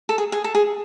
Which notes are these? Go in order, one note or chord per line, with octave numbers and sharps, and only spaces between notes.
A4
G#4
G#4
A4
G#4